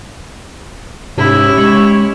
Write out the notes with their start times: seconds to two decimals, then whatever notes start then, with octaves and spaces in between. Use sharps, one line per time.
1.18 G#2 C3 C#4 E4 G4
1.58 G#3 C#5